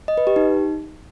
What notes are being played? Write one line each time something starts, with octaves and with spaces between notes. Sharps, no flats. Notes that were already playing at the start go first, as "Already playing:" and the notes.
D#5
B4
G4
D#4